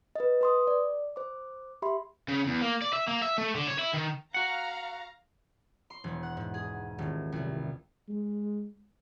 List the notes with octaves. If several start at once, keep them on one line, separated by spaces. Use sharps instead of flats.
B4 D#5
B4 C6 D#6
D5
C5 D6
G4 E5 B5 C6
C#3
E2
A#3
D5
E5
A#3
E5
A3
D3
C#5
E4
D#3
F#4 F5 F#5 A#5
C6
E1
F#5
G#2
G#4
D#1
C2
G#3